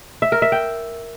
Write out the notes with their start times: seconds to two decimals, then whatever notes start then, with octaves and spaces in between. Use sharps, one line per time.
0.22 E5
0.32 A#4
0.42 E5
0.52 G5